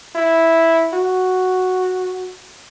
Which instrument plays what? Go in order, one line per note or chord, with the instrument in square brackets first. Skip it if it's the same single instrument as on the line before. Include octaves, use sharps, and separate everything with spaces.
[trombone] E4
F#4